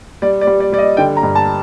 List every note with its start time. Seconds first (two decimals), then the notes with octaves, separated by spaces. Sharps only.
0.22 G3 D5
0.41 D5
0.47 G3
0.60 D5
0.72 G3 D5
0.78 D#5
0.97 D3 G5
1.17 A#5
1.23 G2
1.35 A5